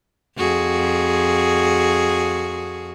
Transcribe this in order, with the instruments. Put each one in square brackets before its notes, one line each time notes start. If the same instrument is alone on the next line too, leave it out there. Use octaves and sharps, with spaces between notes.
[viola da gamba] F2 F#4 G#4